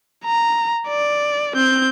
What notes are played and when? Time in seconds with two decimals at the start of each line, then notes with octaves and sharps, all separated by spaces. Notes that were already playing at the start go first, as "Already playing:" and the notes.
0.25 A#5
0.88 D5
1.56 C4 G6